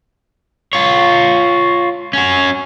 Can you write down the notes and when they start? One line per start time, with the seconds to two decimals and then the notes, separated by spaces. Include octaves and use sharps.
0.73 F4 C#5
2.13 C#4 F#4